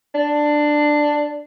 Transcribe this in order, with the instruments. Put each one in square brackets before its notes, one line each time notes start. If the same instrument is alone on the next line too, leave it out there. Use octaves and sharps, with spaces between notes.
[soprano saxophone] D4